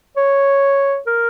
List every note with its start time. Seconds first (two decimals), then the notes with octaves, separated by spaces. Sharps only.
0.17 C#5
1.07 A#4